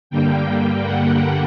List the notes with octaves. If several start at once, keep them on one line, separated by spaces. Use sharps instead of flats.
G2 D3 G3 A#3 G5
F#5